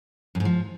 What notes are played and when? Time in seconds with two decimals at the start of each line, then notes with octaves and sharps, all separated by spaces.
0.35 F#2
0.40 G#2
0.45 F3